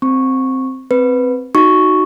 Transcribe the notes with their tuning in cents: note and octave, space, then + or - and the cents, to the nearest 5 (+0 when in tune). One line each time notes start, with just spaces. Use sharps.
C4 +0 C#6 -10
C4 -5 B4 +0
D#4 +0 F#4 +0 C#6 +0